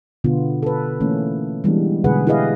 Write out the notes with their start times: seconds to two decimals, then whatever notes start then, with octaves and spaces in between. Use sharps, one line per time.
0.24 B2 D3 B3 F4
0.63 A4 B4
1.00 E3 A3 A#3 C#4
1.64 E3 G3 G#3 B3 D4
2.04 B2 D3 G#3 G#4 B4 F#5
2.27 E4 G4 G#4 B4 D#5 F5